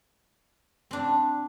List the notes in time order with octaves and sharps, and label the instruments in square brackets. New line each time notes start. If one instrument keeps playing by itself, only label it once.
[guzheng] C4 D4